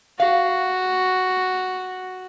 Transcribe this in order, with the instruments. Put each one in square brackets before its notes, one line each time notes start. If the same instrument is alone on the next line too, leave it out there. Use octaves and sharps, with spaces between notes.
[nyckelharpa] F#4 [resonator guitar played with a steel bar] F5 F#5